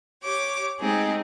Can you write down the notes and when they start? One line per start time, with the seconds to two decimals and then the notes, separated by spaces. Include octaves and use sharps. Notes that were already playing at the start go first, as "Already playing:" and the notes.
0.23 G4 C#5 D6
0.80 G#3 A3 C4 D#4 G4 G#4